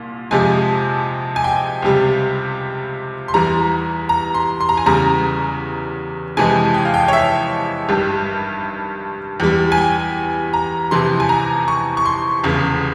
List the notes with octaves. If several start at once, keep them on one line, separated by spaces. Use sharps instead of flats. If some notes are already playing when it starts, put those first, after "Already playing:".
Already playing: C2 A#2
F2 C3 F3 G#3 G#5
G#5
G5
C#2 C3 G3
C6
E2 E3 G3 A#5
A#5
C6
C6
A#5
G#5
E2 C#3 G3 A#5
F2 C3 E3 G#3 G#5
G5
F5
G5
C#5
E5
G#1 G2 G3
E2 E3 G3
G#5
G5
A#5
F2 C3 E3 C6
G#5
A#5
C#6
C#6
C6
F1 E2 C#3